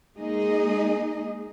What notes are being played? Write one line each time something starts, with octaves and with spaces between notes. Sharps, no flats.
G#3 A#3 D#4 G#4 D#5